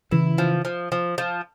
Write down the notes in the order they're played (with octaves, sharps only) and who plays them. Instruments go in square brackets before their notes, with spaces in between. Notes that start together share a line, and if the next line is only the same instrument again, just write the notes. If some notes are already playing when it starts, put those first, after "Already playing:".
[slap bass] C#3 E3 [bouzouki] E4
[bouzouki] F3
F3
F3
F3